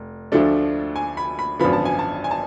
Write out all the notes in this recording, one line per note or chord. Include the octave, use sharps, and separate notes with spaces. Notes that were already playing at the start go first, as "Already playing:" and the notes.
Already playing: F1
D2 D3 F3 A3 D4
G#5
B5
B5
G#1 F#2 D3 F3 B3 B5
A5
G#5
A5
G#5
A5